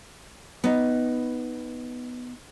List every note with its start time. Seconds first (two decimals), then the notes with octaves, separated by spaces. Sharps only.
0.64 B3 D#4